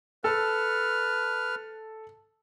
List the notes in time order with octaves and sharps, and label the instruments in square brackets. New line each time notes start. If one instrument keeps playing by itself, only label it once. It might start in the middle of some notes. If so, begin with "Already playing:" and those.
[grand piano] A4 A5 [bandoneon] B4 F6